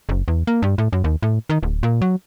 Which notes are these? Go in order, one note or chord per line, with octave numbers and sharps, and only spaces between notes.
F#1
E2
A#3
G2
A2
F#2
D#2
A2
D#3
D1
A#2
F#3